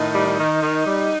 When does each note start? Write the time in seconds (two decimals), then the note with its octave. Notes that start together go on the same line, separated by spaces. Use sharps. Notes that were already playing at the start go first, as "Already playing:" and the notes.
Already playing: A2 D#3 D#4
0.14 G3
0.37 D#3
0.61 D#3
0.85 G3